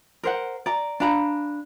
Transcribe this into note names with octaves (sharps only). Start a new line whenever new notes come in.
A#4 C5 F#5
D5 A#5
D4 F5 A#5 B5